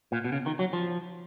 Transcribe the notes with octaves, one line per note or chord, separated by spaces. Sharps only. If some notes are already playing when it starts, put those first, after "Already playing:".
A#2
B2
C#3
D#3
F#3
F3